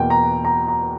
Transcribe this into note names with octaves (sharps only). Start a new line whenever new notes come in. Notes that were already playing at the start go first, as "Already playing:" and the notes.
Already playing: E2 B2 A#3 G5
A#5
A#5
A#5